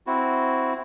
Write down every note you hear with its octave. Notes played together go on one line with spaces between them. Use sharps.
C4 E4 F#4